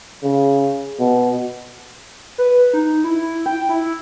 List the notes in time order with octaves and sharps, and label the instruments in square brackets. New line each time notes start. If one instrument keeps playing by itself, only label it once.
[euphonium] C#3
B2
[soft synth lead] B4
D#4
E4
G5
E4